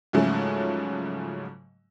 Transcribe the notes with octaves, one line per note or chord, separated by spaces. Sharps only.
G#2 C#3 F3 F#3 A3 C#4